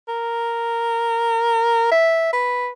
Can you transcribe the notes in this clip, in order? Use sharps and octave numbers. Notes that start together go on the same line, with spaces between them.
A#4
E5
B4